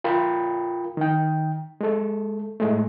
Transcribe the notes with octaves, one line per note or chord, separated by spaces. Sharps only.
F4 A#4 G5 B5
D#3 G5
G#3 A4
A2 G#3 A3